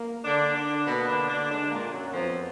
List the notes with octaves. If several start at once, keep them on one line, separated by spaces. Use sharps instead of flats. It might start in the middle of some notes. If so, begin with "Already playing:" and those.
Already playing: A#3
D3 D4
D3 D4
B2 A#3 B3
D3 D4
D3 D4
D3 G#3 D4
A#2 A#3
F#2 F#3
F2 F3 B3